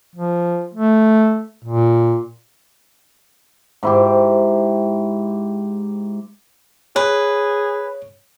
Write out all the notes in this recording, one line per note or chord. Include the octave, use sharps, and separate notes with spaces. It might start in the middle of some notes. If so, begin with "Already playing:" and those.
F3
A3
A#2
G#2 E4 G4
G#4 B4 C#5